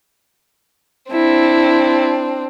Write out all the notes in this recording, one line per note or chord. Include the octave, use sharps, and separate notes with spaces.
C4 D4 E4